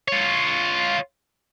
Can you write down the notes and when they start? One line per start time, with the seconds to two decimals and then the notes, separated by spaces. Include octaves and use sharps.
0.08 F4 C#5